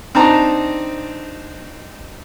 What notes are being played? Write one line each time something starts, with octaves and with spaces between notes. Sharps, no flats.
C4 D4 D#4 A5 A#5